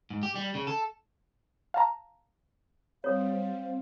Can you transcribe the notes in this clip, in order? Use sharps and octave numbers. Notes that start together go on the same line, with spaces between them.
G#2
G4
G3
C#3
A4
F5 A5 A#5
G3 C4 C#5 F5 D#6